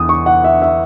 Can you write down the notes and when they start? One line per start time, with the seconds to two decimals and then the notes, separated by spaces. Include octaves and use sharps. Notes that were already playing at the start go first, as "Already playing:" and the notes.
Already playing: E2 D#6
0.09 C#6
0.26 F#5
0.44 E5
0.62 E5